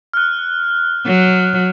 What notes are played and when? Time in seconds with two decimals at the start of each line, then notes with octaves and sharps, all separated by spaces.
0.14 F6 F#6
1.06 F#3